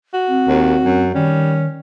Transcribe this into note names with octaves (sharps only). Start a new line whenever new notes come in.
F#4
C4
D#2
F#2
D#3 G3 C#4